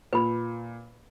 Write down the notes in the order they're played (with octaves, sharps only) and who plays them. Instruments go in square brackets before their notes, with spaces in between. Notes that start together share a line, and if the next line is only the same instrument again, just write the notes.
[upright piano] A#2 [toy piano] B4 B5